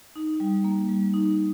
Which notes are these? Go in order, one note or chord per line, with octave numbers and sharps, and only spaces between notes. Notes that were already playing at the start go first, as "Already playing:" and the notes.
D#4
G3
A#3
G3
D#4